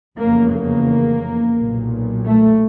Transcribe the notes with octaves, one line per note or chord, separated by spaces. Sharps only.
F1 E2 C#3 A#3
A#3
B1 A#2
A3